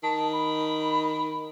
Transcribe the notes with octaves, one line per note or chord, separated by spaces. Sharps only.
D#3 A5
B5